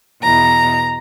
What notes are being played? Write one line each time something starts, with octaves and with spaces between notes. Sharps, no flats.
E2 B2 A#5